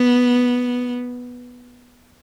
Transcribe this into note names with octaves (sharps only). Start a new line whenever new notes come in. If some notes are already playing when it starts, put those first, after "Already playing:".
Already playing: B3